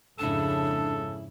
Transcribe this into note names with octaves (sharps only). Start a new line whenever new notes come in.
F2 G#2 C#3 D4 E4 A4 A5